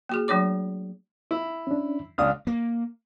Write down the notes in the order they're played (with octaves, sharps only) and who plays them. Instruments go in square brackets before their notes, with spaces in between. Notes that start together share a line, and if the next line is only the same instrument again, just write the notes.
[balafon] A#3 F#4 G#4
F#3 A3 D4 C#5 D6
[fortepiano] E4
[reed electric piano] C#4 D4
[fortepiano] C#2 D4 D#6 [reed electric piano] F5 F6
[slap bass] A#3